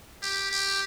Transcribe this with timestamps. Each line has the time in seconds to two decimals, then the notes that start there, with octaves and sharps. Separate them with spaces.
0.22 G4
0.51 G4